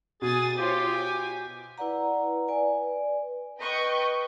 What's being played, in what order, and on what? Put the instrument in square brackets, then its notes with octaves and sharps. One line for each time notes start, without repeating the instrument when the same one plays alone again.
[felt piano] B2 [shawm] G#4 [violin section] G#5 D#6 A6
[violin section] F4 C5 C#5 [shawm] G4
[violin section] G#5
[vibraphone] E4 B4 D5 F#5 A#5
B4 D5 G#5
[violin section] B4 D#5 G5 C#6 G6